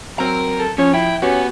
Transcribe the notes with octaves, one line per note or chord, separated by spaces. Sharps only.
F#3 C4 A#4 A#5
A4
F3 C#4 C#5
E4 G5
B3 C#4 F#4 G4